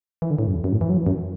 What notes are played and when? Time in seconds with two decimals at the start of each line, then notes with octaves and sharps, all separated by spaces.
0.22 E3
0.31 D3
0.39 A2
0.47 F#2
0.55 E2
0.64 F#2
0.72 A2
0.81 E3
0.89 F#3
0.97 E3
1.06 F#2